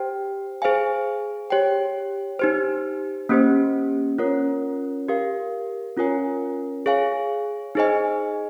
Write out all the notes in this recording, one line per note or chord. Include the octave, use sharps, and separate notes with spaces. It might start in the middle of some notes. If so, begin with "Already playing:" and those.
Already playing: G4 C5 G5
G#4 C5 F5 G#5
G4 C#5 G5
D#4 G4 C5
A#3 C#4 G4 C5
C#4 F4 A#4 C#5
G4 A#4 F5
C#4 F4 A#4 C#5 G#5
G#4 C#5 F5 G#5
D#4 G#4 C5 D#5 G#5